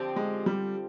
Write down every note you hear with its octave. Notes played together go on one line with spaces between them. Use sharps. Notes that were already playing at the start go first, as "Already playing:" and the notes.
Already playing: D3 F3 C4 G4
G#3
G3